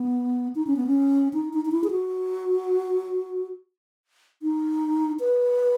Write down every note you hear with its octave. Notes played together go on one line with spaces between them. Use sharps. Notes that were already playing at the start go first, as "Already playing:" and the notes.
Already playing: B3
D#4
C#4
B3
C#4
D#4
D#4
D#4
E4
G#4
F#4
D#4
B4